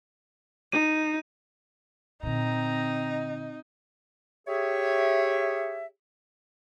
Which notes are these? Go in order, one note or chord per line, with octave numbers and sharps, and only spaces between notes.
D#4 D#7
A#2 D3 C4 D#4 A#5
G4 G#4 C#5 E5